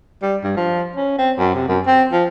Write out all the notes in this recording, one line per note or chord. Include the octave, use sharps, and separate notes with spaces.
G3
G2
F3
C#4
C4
F#2
C3
F#2
C4
F3